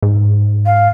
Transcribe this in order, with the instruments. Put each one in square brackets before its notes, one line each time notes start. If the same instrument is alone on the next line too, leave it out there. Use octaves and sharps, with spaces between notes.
[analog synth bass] G#2
[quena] F5